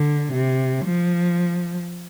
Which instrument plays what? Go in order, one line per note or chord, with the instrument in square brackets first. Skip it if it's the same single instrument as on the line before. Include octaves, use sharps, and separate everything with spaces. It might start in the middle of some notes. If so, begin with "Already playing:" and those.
Already playing: [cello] D3
C3
F3